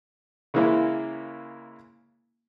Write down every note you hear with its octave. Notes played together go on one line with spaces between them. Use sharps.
C#3 E3 G#3 A#3 C#4 E4